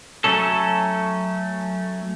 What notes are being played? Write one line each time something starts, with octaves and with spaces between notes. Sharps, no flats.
F#3 A3 C#4 A4